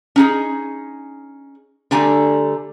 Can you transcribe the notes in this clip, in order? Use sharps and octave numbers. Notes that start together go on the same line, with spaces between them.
C#4 D#4 G#4
D3 G3 A3 G#5 A#5